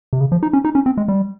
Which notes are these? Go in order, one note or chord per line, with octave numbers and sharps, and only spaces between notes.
C3
C#3
F3
D#4
C#4
D#4
C#4
C4
G#3
G3